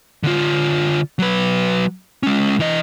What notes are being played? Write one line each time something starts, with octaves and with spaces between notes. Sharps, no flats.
D3 F4
F#3 B4
G#3 C#4
E3 D#5